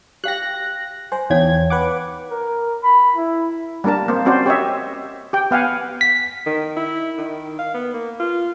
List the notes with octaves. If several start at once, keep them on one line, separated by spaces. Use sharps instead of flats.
G4 F5 G5 F#6 A#6
C5 G#5
E2 D#4 C#5 F5 G5 G#6
B4 F#5 D6
A#4
B5
E4
G3 A#3 D4 A#4 A5
A#3 C4 C5
C4 C#4 F#4 C5 D5
G4 C#5 D#5 E5
G4 G5
B3 F5 F#5 G#5
B6
D#3
E4
D#3
F5
B3
A#3
F4